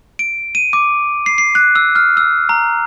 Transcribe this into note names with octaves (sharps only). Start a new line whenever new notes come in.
D7
D#7
D6
C7
C7
F#6
E6
F6
E6
A#5